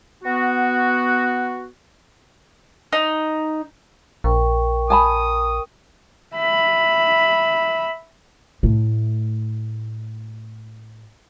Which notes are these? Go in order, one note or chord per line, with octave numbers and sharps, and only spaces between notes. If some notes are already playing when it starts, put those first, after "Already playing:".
B3 F#4
D#4
A#1 A#4 G5 C#6
G#5 A5 B5 D#6
E5 B5
A2 A3